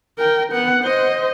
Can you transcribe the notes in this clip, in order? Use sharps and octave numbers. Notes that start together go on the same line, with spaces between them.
A#4 G5
B3 F#5
C5 D#5